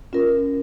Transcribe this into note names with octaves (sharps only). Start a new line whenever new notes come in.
C#4 F4 A#4